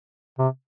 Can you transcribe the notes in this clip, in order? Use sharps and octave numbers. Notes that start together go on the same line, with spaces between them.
C3